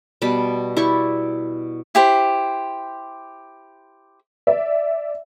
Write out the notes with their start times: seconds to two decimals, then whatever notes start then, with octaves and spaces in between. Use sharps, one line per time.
0.22 B2 G3 A5 B5
0.77 E4 G4 D5 C#6
1.95 E4 G4 C5
4.47 D5 E5